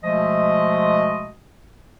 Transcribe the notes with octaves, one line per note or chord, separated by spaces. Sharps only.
B2 F3 G#3 A3 D#5